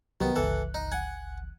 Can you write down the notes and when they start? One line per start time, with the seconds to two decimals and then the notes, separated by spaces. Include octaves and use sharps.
0.21 C2 D#3 F#3 B3 G4
0.36 G1 C#2 E3 A4 F#6
0.74 D#4
0.92 F#5 G#5